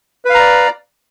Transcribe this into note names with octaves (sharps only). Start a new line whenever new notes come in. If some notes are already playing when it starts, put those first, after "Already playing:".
B4 D5 F5 A#5